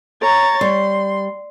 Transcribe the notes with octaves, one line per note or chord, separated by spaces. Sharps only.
C#5 A#5 A6
G3 C6